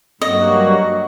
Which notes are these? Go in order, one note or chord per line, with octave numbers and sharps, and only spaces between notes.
G2 F#3 A#3 F#4 D#5